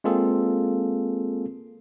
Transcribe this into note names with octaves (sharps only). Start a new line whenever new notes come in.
G#3 A#3 C4 F4 G#4 A4